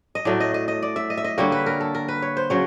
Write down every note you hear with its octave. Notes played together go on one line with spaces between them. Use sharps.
D#5
A2 F#3 A3 D5
D#5
D#5
D#5
D5
E5
D#5
E5
D#5
D3 G3 A#3 C#5
B4
A#4
A4
A#4
B4
C#5
C5
C#3 F#3 C#5